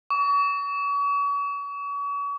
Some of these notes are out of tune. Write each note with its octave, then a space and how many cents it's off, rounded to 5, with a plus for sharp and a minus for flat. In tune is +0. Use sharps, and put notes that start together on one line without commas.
C#6 +40